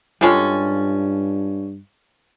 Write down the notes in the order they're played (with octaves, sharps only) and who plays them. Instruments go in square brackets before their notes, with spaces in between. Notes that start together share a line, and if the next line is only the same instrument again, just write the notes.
[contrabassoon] G2 [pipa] G3 G#3 C#4 [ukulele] F4 A4